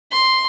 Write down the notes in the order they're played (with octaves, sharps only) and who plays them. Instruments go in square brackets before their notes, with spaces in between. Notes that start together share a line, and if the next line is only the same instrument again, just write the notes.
[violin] C6